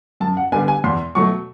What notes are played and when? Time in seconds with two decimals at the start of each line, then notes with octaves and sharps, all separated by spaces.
0.20 F#2 A5
0.37 F#5
0.52 D3 G3 B3 D4 G#5
0.68 G#5
0.84 E2 C6
1.15 B2 F#3 A3 C#6